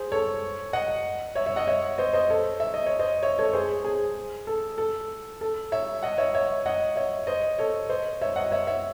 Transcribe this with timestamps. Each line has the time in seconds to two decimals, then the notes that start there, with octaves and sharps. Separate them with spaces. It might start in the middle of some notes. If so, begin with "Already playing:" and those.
Already playing: G#4 C5
0.12 A4 C#5
0.73 D#5 F#5
1.35 C#5 E5
1.46 C#5 E5
1.56 D#5 F#5
1.67 C#5 E5
1.98 C5 D#5
2.13 C5 D#5
2.30 A4 C#5
2.60 E5
2.74 D#5
2.86 C#5
2.99 C5 D#5
3.23 C#5 E5
3.39 A4 C#5
3.53 G#4 C5
3.84 G#4
4.47 A4
4.78 A4
5.41 A4
5.72 C#5 E5
6.03 D#5 F#5
6.18 C#5 E5
6.35 C#5 E5
6.66 D#5 F#5
6.96 C#5 E5
7.27 C5 D#5
7.58 A4 C#5
7.89 C5 D#5
8.22 C#5 E5
8.36 D#5 F#5
8.51 C#5 E5
8.67 C#5 E5